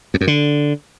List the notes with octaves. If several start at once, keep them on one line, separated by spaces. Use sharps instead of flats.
F2
F#2
D3